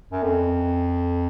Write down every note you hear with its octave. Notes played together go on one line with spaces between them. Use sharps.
F#2
F2